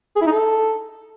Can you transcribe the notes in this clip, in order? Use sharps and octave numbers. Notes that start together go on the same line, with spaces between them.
G#4
E4
D#4
A4